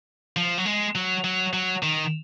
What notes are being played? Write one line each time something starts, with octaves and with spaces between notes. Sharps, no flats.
F3
F#3
G#3
F#3
F#3
F#3
D#3